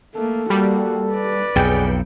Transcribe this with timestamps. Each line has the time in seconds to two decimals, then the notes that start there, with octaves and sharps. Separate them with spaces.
0.16 A3 A#3 A4
0.50 G3 A#3 F#4
1.11 B4 D5
1.56 B1 F2 G#4 G5